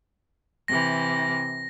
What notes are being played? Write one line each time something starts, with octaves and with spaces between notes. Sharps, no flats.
C3 E3 A#6